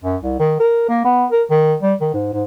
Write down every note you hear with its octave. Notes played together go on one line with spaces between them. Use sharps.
F#2
C2
D#3
A#4
A#3
B3
A#4
D#3
G3
D#3
G#2
G#2